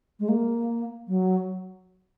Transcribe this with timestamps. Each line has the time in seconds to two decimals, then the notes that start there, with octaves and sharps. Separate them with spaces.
0.20 G#3
0.29 A#3
1.08 F#3